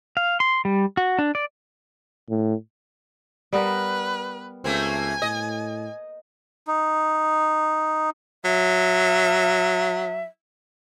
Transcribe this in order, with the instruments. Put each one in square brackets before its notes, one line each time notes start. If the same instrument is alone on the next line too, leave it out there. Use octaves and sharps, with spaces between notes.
[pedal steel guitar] F5
C6
G3
F#4
D4
D5
[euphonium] A2
[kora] G3 B3 A#4 [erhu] B4
[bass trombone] C#2 [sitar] A3 A#3 C4 [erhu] G#5
[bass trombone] A2 [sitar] D#5
[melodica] D#4
[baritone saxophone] F#3 [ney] E5